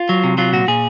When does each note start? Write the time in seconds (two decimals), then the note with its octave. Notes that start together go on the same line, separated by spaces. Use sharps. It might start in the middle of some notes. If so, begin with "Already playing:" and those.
Already playing: F4
0.09 F#3
0.24 C3
0.38 F#3 F4
0.53 A#2 F#4
0.68 A#2 G#4